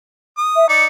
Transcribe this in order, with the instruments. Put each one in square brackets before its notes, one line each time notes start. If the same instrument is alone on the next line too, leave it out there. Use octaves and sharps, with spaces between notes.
[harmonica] D#6
[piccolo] E5
[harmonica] D#4 D5 [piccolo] C#7